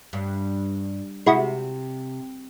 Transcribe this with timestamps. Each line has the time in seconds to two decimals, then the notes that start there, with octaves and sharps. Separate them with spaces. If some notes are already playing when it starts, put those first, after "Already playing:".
0.13 G2
1.26 C3 G#3 E4 F#4